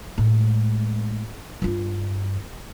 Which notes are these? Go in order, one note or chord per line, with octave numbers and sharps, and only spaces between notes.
A2 G#3
G2 F4